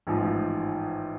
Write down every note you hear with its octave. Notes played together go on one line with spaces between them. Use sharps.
A1 G#2 F3